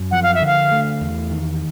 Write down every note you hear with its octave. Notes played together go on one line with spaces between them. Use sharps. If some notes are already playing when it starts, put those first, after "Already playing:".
Already playing: F#2
F3 F#5
F5
E5
D3 F5
A3
E2
D#3